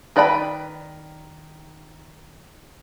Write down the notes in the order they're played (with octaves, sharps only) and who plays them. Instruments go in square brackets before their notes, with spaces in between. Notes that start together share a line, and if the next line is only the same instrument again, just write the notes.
[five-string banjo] D#3 B4 D5 G5 B5